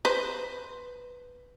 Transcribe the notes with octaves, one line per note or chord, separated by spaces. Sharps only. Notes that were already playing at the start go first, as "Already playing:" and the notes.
B4 C5